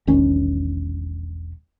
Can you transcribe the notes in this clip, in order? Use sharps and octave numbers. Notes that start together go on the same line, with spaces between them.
E1 A#1 D#3 C#4